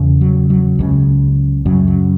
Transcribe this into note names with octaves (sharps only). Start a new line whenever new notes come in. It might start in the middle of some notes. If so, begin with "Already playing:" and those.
Already playing: E2 C#3
F#3
F#3
C#2 C#3
F#2 C#3 F#3
F#3